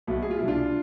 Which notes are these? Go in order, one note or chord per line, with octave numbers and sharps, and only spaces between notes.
B1 B2 A3
G#4
F4
C2 B2 D4 E4 F4